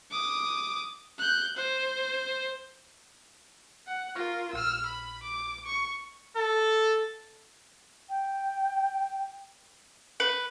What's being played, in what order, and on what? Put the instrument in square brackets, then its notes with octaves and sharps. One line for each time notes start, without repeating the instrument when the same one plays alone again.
[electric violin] D6 D#6
F#6 G6
C5
F#5
[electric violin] F4 A#4 [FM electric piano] C#6 F6 A#6
[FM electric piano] A#1 [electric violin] E6 F6
[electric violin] B5
D6
C#6
[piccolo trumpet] A4
[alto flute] G5
[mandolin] B4